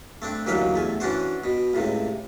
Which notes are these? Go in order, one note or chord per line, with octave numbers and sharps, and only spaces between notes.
A3 C4 D4
D#2 D3 E3 F#3 B4 F5
E2 A3 G#5
E3 C#4 D4 F#4 C5
B2
C#2 A2 C3